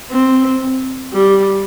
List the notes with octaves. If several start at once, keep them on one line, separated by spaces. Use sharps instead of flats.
C4
G3